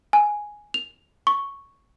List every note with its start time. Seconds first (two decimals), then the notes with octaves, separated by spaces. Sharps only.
0.13 G#5
0.74 F7
1.27 C#6